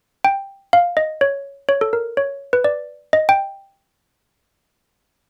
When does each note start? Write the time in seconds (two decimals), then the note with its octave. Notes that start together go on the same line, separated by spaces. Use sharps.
0.24 G5
0.73 F5
0.97 D#5
1.21 C#5
1.69 C#5
1.81 A4
1.93 A#4
2.17 C#5
2.53 B4
2.64 D5
3.13 D#5
3.29 G5